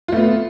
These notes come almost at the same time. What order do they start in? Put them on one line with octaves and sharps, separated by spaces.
F4 A3 B3